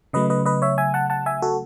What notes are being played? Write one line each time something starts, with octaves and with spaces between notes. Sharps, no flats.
C#3 F#3 A3 B4 D#5
B4 D#5
B4 D#5
C#5 E5
E5 G#5
F#5 A5
F#5 A5
E5 G#5
F#4 A4